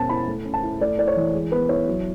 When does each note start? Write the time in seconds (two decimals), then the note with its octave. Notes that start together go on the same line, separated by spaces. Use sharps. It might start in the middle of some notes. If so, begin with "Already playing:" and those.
Already playing: B2 G#3 C#4 A5
0.09 E4 B5
0.28 A3
0.45 C#4
0.54 A5
0.63 E4
0.81 A3 D5
0.98 E4 D5
1.07 C#5
1.16 E3
1.34 G#3
1.52 B3 B4
1.69 E4 C#5
1.87 F#3